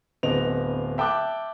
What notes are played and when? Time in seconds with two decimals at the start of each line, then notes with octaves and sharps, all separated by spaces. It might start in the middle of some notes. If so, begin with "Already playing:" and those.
0.23 D1 B3 C4 D#5 F7
0.98 E5 G5 A5 D6 F#6